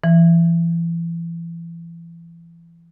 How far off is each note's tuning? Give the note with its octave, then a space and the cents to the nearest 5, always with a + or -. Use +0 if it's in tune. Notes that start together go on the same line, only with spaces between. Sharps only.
E3 +30